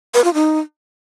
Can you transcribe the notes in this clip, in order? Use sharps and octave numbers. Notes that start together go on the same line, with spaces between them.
B4
F4
D#4